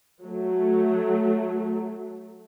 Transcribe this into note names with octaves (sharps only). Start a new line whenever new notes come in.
F#3 A3